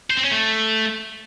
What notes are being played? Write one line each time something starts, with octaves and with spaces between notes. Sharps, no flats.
C5
C4
C#4
A3